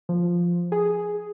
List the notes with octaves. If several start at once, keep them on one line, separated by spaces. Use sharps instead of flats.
F3
G#4